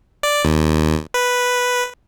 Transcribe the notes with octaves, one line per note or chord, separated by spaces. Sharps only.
D5
D#2
B4